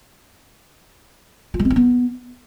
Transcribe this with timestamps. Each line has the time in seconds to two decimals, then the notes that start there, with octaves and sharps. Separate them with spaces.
1.54 F4
1.59 G#3
1.65 C4
1.70 E4
1.76 B3